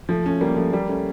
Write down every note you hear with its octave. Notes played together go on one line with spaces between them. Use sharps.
F3 A3
A3 C#4
G3 A#3
F3 A3
G3 A#3
A3 C#4